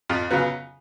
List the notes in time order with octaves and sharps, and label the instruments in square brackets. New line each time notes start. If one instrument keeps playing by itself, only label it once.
[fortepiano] F2 F4
C#3 F#3 B3